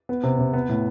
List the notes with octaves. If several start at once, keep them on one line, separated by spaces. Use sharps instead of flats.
B3
C3
C3
B3
A2